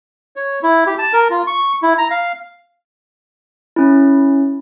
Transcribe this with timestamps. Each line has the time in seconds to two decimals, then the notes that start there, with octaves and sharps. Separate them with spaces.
0.36 C#5
0.63 E4
0.87 G4
0.99 A5
1.13 A#4
1.30 F4
1.47 C#6
1.82 E4
1.98 A#5
2.11 F5
3.76 C#4 E4